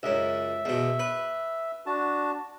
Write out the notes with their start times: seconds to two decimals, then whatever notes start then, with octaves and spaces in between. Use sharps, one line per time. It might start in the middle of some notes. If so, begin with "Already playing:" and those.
0.03 C#2 F#2 E5
0.65 E2 B2
0.99 B4
1.86 D4 F#4 A5